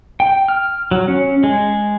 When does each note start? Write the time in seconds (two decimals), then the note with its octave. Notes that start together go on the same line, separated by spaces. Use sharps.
0.20 G5
0.48 F6
0.91 F#3
1.08 C#4
1.44 G#3